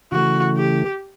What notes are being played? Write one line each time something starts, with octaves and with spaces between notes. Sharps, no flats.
C#3 E3 A3 F#4
G4